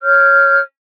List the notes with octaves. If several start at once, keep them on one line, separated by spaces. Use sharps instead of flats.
C#5 F6 G6